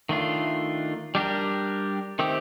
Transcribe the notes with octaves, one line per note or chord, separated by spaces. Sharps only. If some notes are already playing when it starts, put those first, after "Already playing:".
D#3 A3 D4 F4
G3 D4 G4 A#4
D#3 A3 C4 G4